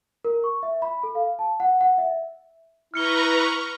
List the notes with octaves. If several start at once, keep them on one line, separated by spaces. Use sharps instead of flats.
A#4
C#6
E5
B5
A4
F5
A5
F#5
F#5
E5
E4 B4 A#5 C#6 F6 C#7 G7